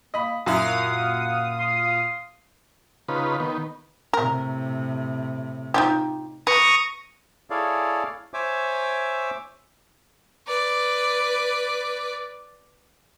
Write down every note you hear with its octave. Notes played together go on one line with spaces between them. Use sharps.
A#3 D#5 B5
F#2 A#2 E4 F5 F#5 D#6
C6
C#3 D#4 F4 B4
D#3 B3
A2 C3 A#4
D#4 F4 G4
B4 A#5 C#6 D#6
E4 G#4 A4 C#5 D5 F5
C5 C#5 E5 G#5 D6 E6
B4 D5